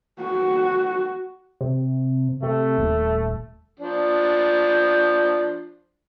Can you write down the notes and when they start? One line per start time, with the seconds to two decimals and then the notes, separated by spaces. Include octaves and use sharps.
0.21 F#4
1.61 C3
2.43 C3 A3
2.78 D#1
3.80 F3 D4